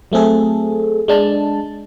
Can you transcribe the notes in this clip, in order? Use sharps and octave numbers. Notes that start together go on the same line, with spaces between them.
F#3 A3 C4 G#4 A4
G#3 D4 A5